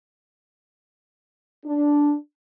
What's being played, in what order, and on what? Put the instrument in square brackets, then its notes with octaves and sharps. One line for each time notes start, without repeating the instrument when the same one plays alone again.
[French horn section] D4